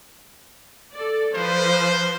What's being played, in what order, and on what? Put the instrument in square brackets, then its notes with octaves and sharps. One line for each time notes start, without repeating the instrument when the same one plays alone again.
[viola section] A4 D5
[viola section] F3 B4 [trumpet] C5